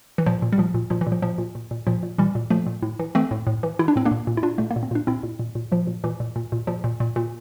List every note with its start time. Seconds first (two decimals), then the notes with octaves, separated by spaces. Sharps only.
0.18 E3
0.26 A#2 F3
0.42 A#2
0.52 G3
0.58 A#2 F3
0.74 A#2
0.90 A#2 F3
1.01 E3
1.07 A#2
1.12 F3
1.22 A#2 F3
1.38 A#2
1.55 A#2
1.71 A#2
1.87 A#2 F3
2.03 A#2
2.18 A#2 E3 G3
2.35 A#2
2.50 A#2 F3 A3
2.66 A#2
2.82 A2
2.99 E3
3.15 E3 A3 C4
3.31 A2
3.47 A2
3.63 E3
3.79 E3 E4
3.88 D4
3.96 A2 C4
4.05 A#3 D4
4.11 A#2
4.27 A#2
4.37 E4
4.43 A#2 D4 F4
4.58 A#2 A3
4.71 A#3
4.76 A#2
4.83 C4
4.91 A#2 D4
5.07 A#2 C4 E4
5.23 A#2
5.39 A#2
5.55 A#2
5.72 A#2 F3
5.87 A#2
6.04 A#2 E3
6.20 A#2
6.36 A#2
6.52 A#2
6.67 A#2 F3
6.84 A#2
7.00 A#2
7.16 A#2